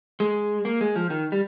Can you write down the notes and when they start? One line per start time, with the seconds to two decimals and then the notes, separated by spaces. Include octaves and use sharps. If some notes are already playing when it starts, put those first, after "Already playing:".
0.20 G#3
0.65 A#3
0.81 G#3
0.96 F3
1.10 D#3
1.32 G3